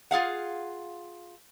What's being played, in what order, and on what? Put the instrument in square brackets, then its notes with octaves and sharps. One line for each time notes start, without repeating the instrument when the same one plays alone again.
[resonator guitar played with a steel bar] F4 G#4 F5 F#5